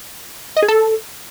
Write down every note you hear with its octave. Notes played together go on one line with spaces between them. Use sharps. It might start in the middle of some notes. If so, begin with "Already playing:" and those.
D#5
G#4
A4